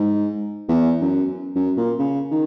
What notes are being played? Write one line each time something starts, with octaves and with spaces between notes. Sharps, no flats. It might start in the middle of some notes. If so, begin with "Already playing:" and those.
Already playing: G#2
E2
F#2
F#2
A#2
C#3
D#3